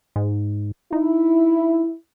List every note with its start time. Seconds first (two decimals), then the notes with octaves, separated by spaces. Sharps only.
0.16 G#2
0.93 D#4 E4